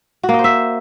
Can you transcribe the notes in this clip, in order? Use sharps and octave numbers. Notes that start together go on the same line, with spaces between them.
F#4
A#3
D#5
C5
E5